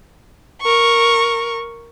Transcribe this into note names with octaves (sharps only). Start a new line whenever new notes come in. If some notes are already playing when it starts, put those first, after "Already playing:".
A#4 C#6